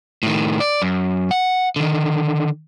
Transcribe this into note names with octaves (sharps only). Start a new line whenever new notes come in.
A2 D#3
D5
F#2
F#5
D3 D#3